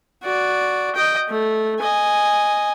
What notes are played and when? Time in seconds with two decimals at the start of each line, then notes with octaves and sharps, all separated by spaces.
0.23 F#4 D5
0.95 D#5 G5
1.29 A3
1.80 D#5 G#5